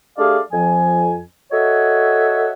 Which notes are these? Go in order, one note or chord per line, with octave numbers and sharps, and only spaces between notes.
A3 D4 G4 G#4 D5 F5
F2 F3 G#5
F#4 A4 C#5 D#5 E5 F#5